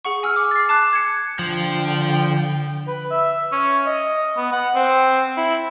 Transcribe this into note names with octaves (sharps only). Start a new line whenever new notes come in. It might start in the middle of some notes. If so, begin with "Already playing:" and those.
G#4 F#5 C#6
G#5 E6 F6
D6
A6 C7
A5 D6 F#6
G#6 C#7
D3 F3 G5
B4
E5
C#4
D#5
B3
F#5
C4
E4